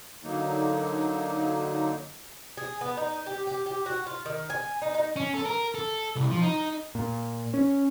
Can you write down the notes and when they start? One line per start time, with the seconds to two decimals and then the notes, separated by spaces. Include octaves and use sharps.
0.24 D3 F#3 A#3 D#4
2.57 G#4
2.81 B3
2.97 D#4
3.26 G4
3.47 G4
3.66 G4
3.86 F#4
4.07 F4
4.26 D#3
4.50 G#5
4.82 D#4
4.95 D#4
5.16 C#4
5.34 A4
5.46 A#4
5.75 A4
6.16 C2
6.30 F3
6.42 D#4
6.95 A#2
7.54 C#4